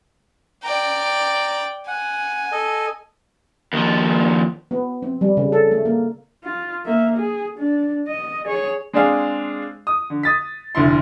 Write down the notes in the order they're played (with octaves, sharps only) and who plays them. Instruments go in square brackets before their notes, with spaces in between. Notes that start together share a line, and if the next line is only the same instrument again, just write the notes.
[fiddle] D5 G5 [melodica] A#5
[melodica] F#5 [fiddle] G#5
[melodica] A4 D#5
[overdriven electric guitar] D#2 F3
[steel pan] B3
C4
G3
C#3
A4
A3
A#3
[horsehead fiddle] F4
A#3 E5
G#4
D4
D#5
G#4 C#5
[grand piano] G#3 C4 D4 G#4 F5
D#6
D3
D#6 A6 B6
F1 D2 D3 E4 C6